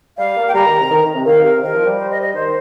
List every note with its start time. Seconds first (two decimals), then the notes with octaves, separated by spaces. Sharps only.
0.18 G3 F5
0.36 A#3
0.48 G5
0.54 G3 A#5
0.66 D#3
0.78 C3
0.90 D#3
1.02 D#3
1.14 C3
1.26 D#3 F5
1.44 C3 A#4
1.62 D#3 A#4
1.74 F3
1.86 G3
1.98 C5
2.10 D#5
2.22 D#5
2.34 D#3 C5